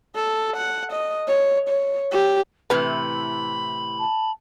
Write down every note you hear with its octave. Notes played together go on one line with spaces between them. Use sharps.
A4
F#5
D#5
C#5
C#5
G4
A2 C3 E3 B4 B5
A5